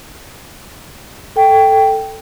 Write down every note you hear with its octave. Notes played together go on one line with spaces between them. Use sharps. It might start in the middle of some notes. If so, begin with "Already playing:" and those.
A4 G5